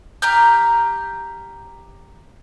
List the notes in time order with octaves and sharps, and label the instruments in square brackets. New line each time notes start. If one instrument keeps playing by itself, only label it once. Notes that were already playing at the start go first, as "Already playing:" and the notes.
[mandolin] G4 A#5 F6 G6